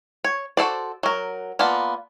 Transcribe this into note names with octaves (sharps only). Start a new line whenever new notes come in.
C#5
F#4 A4 C5 D5
F#3 A#4
A#3 B3 F4 D5 A5